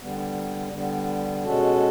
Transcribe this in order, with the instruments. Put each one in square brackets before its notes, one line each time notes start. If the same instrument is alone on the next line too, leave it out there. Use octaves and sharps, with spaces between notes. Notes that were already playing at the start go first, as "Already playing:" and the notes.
[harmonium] D3 G3 B3
D3 G3 B3
B2 G#3 C#4 F#4 A4